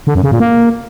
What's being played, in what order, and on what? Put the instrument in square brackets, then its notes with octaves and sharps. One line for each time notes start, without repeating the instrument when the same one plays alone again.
[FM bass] D3
F#2
C#3
A#2
A#3